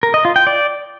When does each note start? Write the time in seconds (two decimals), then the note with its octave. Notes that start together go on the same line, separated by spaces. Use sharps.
0.03 A#4
0.14 D#5
0.25 F4
0.36 G5
0.47 D5